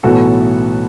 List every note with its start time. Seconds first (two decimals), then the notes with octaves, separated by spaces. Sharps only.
0.03 B1 A2 E3 B3 F#4 A4